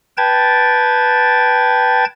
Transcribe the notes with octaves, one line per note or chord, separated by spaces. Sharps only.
B4 G5 A5 G#6 A6